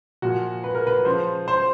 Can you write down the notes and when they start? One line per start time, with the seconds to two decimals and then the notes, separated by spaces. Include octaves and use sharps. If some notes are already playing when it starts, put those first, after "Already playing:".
0.22 A#2 F3 F#4
0.64 B4
0.75 A#4
0.87 B4
1.05 C#3 F3 C5
1.48 C5